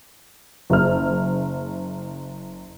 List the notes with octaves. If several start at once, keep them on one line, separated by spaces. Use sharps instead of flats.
F#1 F6